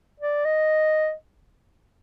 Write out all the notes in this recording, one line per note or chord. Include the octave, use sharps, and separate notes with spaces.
D5
D#5